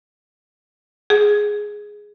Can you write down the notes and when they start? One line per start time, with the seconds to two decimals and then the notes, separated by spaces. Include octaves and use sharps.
1.10 G#4